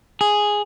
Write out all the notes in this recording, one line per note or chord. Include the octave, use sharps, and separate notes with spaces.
G#4